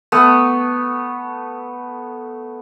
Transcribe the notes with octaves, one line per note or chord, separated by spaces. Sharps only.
A3 B3